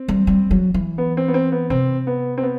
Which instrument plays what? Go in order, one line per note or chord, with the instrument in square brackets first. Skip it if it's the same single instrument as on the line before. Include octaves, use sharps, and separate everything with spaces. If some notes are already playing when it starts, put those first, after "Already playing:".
Already playing: [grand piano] C4
[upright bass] G3
G3
F#3
E3
[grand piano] B3
C4
B3
C4
B3
[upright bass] C3 [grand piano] C4
[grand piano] B3
C4
B3